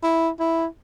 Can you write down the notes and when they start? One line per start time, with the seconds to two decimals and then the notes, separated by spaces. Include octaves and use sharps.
0.03 E4
0.40 E4